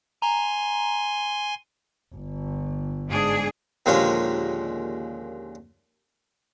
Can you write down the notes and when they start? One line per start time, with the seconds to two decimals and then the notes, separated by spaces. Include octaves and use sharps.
0.22 G#5 A#5 C6
2.14 G1
3.08 G#2 D4 G#4
3.86 D#2 A#2 D3 F3 G#3 C#4